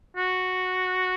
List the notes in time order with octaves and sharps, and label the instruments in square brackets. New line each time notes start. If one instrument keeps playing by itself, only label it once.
[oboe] F#4